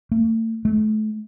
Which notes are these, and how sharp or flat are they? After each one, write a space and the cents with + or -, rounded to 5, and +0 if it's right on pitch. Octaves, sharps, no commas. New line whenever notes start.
A3 +40
A3 -35